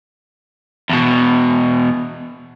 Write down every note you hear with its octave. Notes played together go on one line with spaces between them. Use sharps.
E2 B2